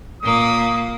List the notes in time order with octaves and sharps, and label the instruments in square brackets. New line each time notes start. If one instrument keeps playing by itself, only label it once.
[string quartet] A#2 A#3 [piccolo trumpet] D#6